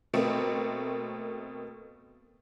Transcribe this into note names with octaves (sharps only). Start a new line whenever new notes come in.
B2 A3 A#3 C4